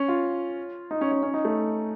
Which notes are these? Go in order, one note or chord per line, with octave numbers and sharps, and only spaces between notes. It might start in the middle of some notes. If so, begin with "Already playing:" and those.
Already playing: C#4
F4
D#4
C#4
C#4
C#4
D#4
A3